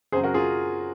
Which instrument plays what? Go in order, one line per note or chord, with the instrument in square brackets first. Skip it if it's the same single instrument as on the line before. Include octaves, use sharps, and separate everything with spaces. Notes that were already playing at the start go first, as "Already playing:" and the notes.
[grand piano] F#2 C#3 F#3 C4 G#4 C5
F#4 A#4
F4 G#4